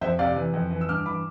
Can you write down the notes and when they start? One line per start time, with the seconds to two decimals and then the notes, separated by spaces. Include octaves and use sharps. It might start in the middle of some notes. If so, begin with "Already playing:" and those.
0.01 F2 C5 E5
0.19 C3 D5 F5
0.36 E3
0.53 F2
0.71 E3
0.81 E6
0.89 G2 D6 F6
1.06 E3 B5 D6